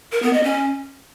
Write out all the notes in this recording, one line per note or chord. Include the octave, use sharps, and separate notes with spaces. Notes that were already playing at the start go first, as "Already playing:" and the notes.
A#4
B3
D#5
C#4